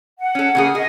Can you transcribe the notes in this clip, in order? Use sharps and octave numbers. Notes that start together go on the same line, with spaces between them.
F#5
C#4 A4
C#3 A#3 G#4
G#4 D#5